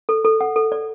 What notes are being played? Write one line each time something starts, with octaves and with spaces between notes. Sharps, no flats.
A4
A4
F#5
A4
D5